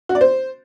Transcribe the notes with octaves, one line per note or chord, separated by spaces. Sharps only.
F#4
D5
C5